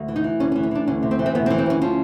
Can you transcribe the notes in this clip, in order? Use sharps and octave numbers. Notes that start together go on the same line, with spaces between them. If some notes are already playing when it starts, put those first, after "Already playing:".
Already playing: D2
E3
D#4
E3
D2 C#4
C#4
E3
C#4
E3 D4
D2 C#4
C3
C4
E3
C4
D2 B3
C4
E3
C4
D2 C#4
F3 C#4